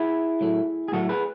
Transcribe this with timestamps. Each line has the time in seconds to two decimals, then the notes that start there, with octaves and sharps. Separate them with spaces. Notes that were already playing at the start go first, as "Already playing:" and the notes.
Already playing: E4 G#4
0.41 A2 F#3 A3
0.88 G#4
0.92 A2 F#3 A3 F#4 A4
1.09 G#4 B4